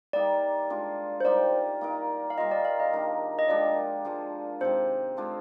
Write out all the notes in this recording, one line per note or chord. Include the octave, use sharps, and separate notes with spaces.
G3 A#3 D#4 G4 D5
G#3 D4 F4
C5
G3 A#3 D#4 G4 D5
A#3 D#4 A#4
F5
G3 A#3 F4 G#4 D#5
D5
F5
D#5
D#3 A#3 D4
D#5
F3 G#3 D4 G4 D5
F3 G#3 D4 G#4
C3 D#3 G#3 C5
G#3 D4 F4